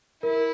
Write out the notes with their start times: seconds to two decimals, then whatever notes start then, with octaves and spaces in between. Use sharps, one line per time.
0.23 E4 A#4